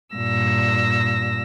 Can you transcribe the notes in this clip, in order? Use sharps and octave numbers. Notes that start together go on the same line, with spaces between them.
G2 A#2 E6 A#6